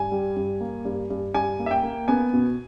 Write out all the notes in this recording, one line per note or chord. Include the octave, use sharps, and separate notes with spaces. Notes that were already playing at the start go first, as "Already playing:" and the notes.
Already playing: G2 G#5
G3
G2
A#3
G2
G2
G2 G#5
A#3
E5
G5
A#3
B3 G#5
B2